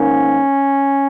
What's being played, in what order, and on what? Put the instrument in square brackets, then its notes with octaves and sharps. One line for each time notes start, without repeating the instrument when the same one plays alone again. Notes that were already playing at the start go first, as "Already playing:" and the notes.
Already playing: [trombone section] G#2 D#3 A#3 C#4